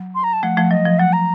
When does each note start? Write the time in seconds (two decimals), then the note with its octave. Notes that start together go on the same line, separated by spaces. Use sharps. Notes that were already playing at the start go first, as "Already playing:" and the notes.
Already playing: F#3
0.15 C6
0.24 A#5
0.33 A5
0.43 F3 A3 F#5
0.57 F3 A3
0.71 F#3 D#5
0.85 F3
0.99 F#3 F#5
1.13 A#5